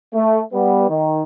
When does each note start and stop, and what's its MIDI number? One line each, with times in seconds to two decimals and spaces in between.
0.13 0.39 57
0.53 0.89 55
0.53 0.89 59
0.89 1.22 51